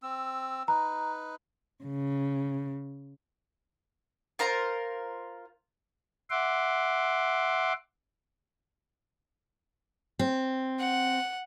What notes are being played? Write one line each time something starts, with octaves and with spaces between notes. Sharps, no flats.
C4 E6
D#4 B4 A#5
C#3
F4 A#4 C5 A#5
E5 F#5 C6 D6
C4
F#5